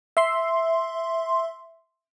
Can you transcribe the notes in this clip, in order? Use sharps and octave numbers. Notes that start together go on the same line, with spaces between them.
E5 C6